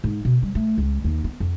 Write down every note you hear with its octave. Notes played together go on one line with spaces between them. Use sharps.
G#2
B2
G3
A3
C#2
D#2
B3
F2